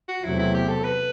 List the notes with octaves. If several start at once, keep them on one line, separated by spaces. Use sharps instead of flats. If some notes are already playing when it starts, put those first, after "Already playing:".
F#4
E2 C3 F#3 A3 C4 E4
E4
G4
A4
B4